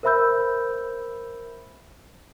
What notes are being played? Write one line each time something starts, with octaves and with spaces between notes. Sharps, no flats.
A#4 C5 E5 B5 E6 G6